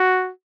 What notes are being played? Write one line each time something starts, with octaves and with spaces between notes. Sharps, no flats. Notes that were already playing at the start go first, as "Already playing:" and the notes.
Already playing: F#4